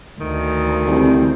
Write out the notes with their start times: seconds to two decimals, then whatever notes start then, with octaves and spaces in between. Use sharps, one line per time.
0.20 D2 D#3
0.87 C2 C4